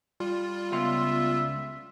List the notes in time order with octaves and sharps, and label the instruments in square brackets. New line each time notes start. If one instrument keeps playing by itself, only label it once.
[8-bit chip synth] G3 F4
[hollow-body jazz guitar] C#2 F5 C6 [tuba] B3 [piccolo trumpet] E5